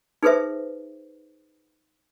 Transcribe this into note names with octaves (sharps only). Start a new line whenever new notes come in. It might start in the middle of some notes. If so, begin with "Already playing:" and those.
D#4 G#4 A4 B4 C5 E5